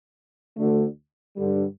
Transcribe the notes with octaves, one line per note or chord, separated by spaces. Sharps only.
D2 D3 A3
G2 D3 G3